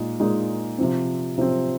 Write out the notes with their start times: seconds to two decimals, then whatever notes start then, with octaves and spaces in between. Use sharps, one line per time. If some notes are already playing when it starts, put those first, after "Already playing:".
Already playing: A#2 G#3 D#4
0.20 A#2 G#3 D#4 G#4
0.78 C3 F3 C4
1.38 C3 F3 C4